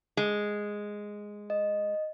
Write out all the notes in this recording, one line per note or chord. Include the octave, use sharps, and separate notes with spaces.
G#3
D#5